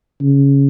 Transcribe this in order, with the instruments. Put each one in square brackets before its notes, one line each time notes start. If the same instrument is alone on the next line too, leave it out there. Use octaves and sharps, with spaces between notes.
[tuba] C#3